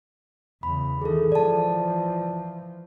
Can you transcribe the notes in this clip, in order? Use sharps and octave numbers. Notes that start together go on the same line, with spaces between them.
E2 C#3 B5
D#3 E3 G#4 A4
E3 F3 D5 A5